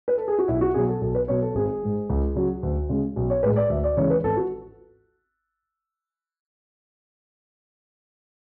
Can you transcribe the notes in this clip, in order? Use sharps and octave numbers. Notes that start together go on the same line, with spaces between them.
B4
A4
G#4
F#4
B1 E4
F#4
B2 F#3 G#4
A4
B1 A4
B4
B2 F#3 C#5
A4
G#1 G#4
G#2 G#3
C#2
C#3 F#3
D2
C#3 G#3
B1
C#5
A2 G#3 B4
D5
D2 E5
D5
C#3 E3 G#3 C#5
B4
G#1 A4
F#4